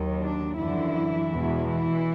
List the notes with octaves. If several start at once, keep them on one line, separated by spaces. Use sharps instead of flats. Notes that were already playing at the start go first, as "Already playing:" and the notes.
Already playing: D#2 D#3 F#3
D4
F#2 D3 E3 F3 E4
E2 B2 G#3
E3 E4